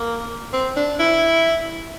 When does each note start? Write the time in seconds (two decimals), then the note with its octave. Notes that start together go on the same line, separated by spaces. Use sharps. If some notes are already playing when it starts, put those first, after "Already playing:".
Already playing: A#3
0.53 C4
0.76 D4
0.99 E4